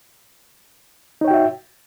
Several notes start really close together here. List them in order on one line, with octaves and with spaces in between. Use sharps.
D#4 C#5 G5 F#4 E5